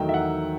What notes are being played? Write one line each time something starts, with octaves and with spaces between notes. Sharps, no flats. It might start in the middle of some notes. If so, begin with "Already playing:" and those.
Already playing: E2 D#3 F#3 A3 D#4 G5
E5
F#5